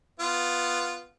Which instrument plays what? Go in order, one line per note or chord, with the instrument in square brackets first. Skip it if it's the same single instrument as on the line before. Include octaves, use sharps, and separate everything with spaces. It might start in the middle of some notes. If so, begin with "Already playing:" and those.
[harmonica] B3 F4